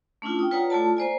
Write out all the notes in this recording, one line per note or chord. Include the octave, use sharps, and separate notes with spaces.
A3 C#4 D4 E4 F4
G5 D#6
F4 B4 C#5 D5 F#5 A#5
A3 E4 F4 A4 D5 A5
A#3 C5 D5 G#5